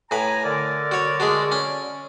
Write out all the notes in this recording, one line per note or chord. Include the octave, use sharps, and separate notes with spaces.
A2 B4 G#5 A#5
D3 A#4 D5
F#4 C#5
G#3 D4 F#4
C#4